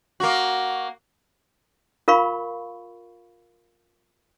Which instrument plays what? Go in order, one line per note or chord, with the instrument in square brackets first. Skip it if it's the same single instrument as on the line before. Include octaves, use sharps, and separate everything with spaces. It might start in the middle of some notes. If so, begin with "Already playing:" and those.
[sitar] A#3 F#4
[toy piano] F4 A#4 F5 B5 C#6